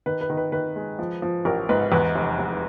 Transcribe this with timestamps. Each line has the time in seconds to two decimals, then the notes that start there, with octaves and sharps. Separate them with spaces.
0.06 D#3 B4
0.21 B4
0.30 D#3
0.37 B4
0.52 D#3 B4
0.76 G#3
0.99 F3
1.22 F3
1.45 A1 A#4
1.69 G#2 B4
1.92 E2 B4
2.15 F1
2.39 F1